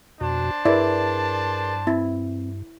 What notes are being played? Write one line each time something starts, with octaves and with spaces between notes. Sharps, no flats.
F2 B2 D4 F#4 C5 A5
G2 E4 G#4 A#4 B4 D5
C4 E4